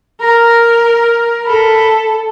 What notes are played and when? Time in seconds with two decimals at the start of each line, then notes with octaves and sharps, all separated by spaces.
0.21 A#4 A#5
1.46 A4 B5